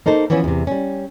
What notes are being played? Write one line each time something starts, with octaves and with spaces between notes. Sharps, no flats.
A#3 D#4 A4 C5
E3 F3 B3 C#4 E4
E2 C3
G3 C#4